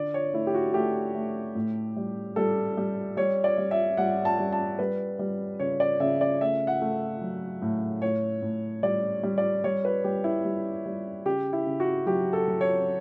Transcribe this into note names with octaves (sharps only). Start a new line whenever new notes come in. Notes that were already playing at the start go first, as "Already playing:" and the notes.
Already playing: D3 D5
C#5
A3 E4
G4
F#4
A3 G4
A3
A2
G3
G3 A4
G3
G3 C#5
D5
G3
E5
G3 F#5
A5
G3
A5
G3 B4
G3
C#3 C#5
D5
C#3 E5
D5
A3 E5
F#5
A3
F#3
A2
A2 C#5
A2
G3 D5
G3
D5
G3 C#5
B4
G3 G4
E4
G3
G3
C#3 G4
E4
C#3
F#4
F#3 G4
A4
F#3
C#5